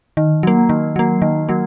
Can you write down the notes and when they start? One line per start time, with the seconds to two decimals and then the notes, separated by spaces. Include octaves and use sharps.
0.17 D#3
0.43 F#3 A#3
0.69 D#3
0.96 F#3 A#3
1.22 D#3
1.49 F#3 A#3